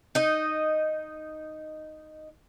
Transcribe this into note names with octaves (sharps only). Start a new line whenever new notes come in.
D#4 D#5